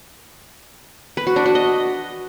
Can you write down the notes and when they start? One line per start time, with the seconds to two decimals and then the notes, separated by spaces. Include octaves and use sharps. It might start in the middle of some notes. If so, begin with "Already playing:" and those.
1.17 B4
1.27 F#4
1.36 D4
1.46 F#4
1.55 D#5